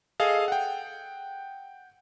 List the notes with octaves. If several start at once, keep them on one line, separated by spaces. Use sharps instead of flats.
G#4 A4 D#5 F5
F#5 G5